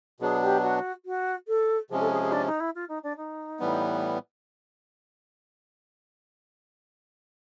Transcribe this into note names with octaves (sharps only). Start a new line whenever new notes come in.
B2 F#3 B3 D4 G#4
G4
F#4
F#4
A4
C3 F3 G#3 C#4 G#4
A4
G#4
G#4
D4
D#4
E4
F4
D#4
D4
D#4
A2 E3 G3 B3